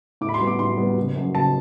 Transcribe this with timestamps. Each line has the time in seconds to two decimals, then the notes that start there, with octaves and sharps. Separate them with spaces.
0.21 A2 D6
0.29 B5
0.34 C6
0.40 G3 B3
0.47 D6
0.59 A2 C6
0.78 G3 B3
0.97 F#1
1.16 F#2 F#3
1.35 F#1 A5